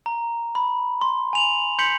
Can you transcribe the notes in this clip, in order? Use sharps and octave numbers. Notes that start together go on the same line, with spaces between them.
A#5
B5
C6
G#5 F7 F#7
C6 G6 B6 C#7 F#7